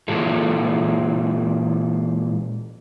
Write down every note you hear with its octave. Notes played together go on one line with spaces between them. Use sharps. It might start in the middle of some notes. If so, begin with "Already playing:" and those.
A#2 E3 G#3 F4 G#4 A4